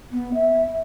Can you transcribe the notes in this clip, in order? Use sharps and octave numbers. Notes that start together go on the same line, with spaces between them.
B3
E5